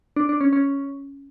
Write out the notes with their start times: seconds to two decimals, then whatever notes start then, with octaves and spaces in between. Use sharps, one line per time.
0.16 D4
0.29 D4
0.41 C#4
0.53 C#4